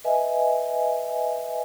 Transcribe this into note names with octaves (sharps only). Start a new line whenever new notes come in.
B4 D#5 E5 G#5